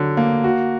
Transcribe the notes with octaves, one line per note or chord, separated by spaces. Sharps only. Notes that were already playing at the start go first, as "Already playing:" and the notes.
Already playing: D3 F#3
A#3
F#4